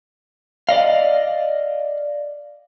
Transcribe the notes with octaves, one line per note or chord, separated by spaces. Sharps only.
D5 D#5 F5